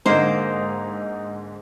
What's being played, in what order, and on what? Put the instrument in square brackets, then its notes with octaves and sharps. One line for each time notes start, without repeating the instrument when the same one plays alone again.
[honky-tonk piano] G#2 D3 [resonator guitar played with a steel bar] A#3 C5 [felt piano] D#4